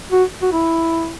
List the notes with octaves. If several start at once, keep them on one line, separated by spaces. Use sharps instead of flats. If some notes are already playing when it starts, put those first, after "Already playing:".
F#4
F#4
E4